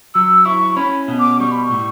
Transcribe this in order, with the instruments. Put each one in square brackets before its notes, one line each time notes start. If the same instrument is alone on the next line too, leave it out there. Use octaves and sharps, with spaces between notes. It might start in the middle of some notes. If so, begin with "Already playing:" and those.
[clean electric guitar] F#3 [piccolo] E6
[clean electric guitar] E4 [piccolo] C#6
[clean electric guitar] C#4 [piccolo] B5
[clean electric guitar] B2
[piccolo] D6
[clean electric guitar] G3 [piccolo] C#6
[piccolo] B5
C#6
[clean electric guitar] A2